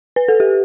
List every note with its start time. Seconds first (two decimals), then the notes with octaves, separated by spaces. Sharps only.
0.16 B4
0.28 A4
0.40 G4